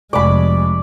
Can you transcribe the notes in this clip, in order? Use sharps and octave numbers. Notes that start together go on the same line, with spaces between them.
F1 G#3 D5 B5